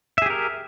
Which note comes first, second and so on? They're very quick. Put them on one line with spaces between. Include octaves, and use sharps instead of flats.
E5 G#4 G4 A#4